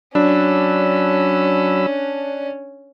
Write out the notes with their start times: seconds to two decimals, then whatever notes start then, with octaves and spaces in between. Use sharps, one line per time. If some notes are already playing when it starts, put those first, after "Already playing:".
0.15 F#3 C#4 D4 B5 E6